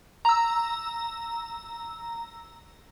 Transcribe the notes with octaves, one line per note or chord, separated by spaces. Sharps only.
A#5 E6